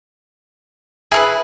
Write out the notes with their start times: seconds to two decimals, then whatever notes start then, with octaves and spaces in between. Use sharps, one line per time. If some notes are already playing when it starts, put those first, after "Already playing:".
1.12 E4 G#4 A#4 B4